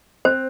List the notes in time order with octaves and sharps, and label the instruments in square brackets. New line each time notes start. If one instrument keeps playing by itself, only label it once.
[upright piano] C4 [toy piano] C5